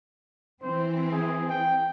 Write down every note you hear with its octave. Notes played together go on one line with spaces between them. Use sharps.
E3 C4 C5
G#4
G5